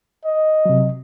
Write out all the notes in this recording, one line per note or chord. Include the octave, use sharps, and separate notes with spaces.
D#5
C3 F#3